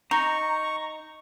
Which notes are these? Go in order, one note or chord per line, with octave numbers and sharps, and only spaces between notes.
D#4 A#5 C#6